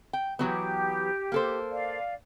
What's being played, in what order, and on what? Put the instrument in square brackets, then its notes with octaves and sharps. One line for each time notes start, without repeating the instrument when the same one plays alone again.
[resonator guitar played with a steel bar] G5
[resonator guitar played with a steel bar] E3 F#3 B3 [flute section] G4
[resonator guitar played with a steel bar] A#3 A4 C5
[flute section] D5 F5